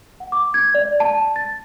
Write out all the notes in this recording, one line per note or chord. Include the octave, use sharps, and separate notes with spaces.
F#5
D6
G#6
D5
A5
A6